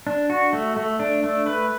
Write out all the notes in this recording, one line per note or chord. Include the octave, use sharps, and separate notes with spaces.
D4
F#4
A3
A3
D4
A3
B4